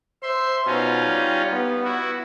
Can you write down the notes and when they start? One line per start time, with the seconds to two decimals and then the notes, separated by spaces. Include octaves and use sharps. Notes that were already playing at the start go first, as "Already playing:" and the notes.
0.23 C5 E5 C6
0.66 B2 C#4 D#4 F4
1.05 G3
1.52 B3
1.84 E4 F#4